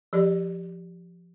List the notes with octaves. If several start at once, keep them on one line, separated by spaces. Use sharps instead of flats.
F3 G4 D5